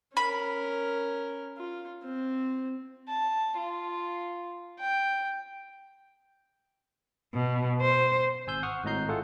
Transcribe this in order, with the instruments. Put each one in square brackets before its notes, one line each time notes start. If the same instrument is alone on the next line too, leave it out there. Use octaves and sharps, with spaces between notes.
[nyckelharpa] C#4 A#4 [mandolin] B5
[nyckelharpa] F4
C4
[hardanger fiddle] A5
F4
G5
[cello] B2
C5
[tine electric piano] G#1 G#5 E6 G6
F#5 C#6 D#6 F6
G#1 A2 D#5 A#5 G6 C7
A3 F4 G#4 A4 F#5